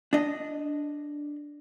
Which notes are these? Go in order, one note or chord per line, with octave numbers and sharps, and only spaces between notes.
D4 D#5